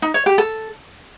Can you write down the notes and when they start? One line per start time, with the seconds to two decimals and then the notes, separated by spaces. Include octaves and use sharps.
0.02 D#4
0.14 C#5
0.26 G4
0.38 A4